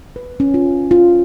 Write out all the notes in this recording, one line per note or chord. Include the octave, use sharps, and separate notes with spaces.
B4
C#4
F4
F4